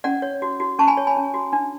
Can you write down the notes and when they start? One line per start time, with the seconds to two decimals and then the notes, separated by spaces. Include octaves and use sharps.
0.04 C#4 D5 F#5
0.22 C#5
0.42 F#4
0.60 F#4
0.79 C#4 A5 C#6
0.87 G#5 B5
0.97 C#5
1.07 G#5 B5
1.16 C#4
1.34 F#4
1.53 D4